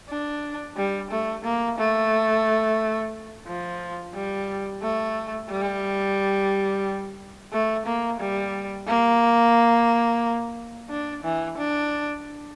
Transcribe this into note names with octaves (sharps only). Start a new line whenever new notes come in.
D4
G3
A3
A#3
A3
F3
G3
A3
G3
A3
A#3
G3
A#3
D4
E3
D4